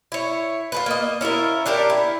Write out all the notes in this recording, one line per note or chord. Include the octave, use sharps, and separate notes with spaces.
E4 C#5
F4 A4 B4
A#3 D#5
C#4 E4 F4 A#4
D4 G4 A4 A#4
E4